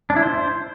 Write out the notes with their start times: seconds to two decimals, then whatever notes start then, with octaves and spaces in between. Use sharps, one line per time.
0.10 D4
0.16 E4
0.23 C5